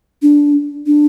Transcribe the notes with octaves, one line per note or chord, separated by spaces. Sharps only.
D4
D4